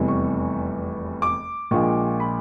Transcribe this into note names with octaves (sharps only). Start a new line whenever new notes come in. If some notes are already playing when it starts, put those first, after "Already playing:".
Already playing: F1 E2 C3 E3 G3
C#6
D6
A#1 A#2 F3 G#3 C#6
B5